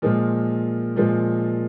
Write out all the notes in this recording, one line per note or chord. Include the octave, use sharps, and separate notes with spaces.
A#2 F3 G#3
A#2 F3 G#3